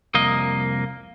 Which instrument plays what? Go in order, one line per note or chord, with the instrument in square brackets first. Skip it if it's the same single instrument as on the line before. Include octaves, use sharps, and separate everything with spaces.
[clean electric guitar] C2 F2 A#3 D#5